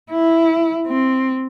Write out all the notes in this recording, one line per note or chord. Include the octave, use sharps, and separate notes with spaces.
E4
C4